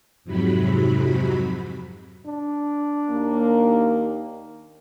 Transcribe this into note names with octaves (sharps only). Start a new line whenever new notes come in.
F2 G#2 C3 F#3 B5
D4
D#2 A#3